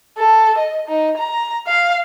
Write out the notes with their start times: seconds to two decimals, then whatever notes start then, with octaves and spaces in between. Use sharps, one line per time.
0.19 A4
0.58 D#5
0.88 D#4
1.17 A#5
1.67 F5